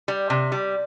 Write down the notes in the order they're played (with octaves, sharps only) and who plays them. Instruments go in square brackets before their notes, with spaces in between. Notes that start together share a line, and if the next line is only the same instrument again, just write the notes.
[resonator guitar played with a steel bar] G3
C3
G3